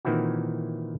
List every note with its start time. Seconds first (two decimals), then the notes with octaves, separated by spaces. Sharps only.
0.05 A#2 D#3 E3 C4 E4 F#4